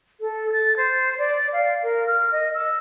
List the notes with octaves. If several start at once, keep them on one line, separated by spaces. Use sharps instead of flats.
A4
A6
C5
D5
F5
A#4
F6
D#5
E6